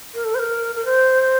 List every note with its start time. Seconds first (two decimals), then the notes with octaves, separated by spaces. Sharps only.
0.14 A#4
0.25 A4
0.35 C5
0.39 A#4
0.75 A#4
0.85 C5